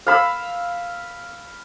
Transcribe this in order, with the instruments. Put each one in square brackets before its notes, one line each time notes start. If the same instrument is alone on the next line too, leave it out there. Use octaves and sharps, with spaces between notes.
[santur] F5 B5 E6